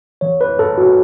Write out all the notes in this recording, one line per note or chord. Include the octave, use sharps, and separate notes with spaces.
E3 C#5
B4
G2 A4
F#4